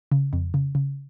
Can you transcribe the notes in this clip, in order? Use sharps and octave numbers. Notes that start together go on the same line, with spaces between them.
C#3
F2
C#3
C#3